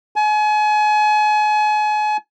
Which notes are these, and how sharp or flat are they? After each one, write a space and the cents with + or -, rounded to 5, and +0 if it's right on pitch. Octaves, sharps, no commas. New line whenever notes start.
G#5 +35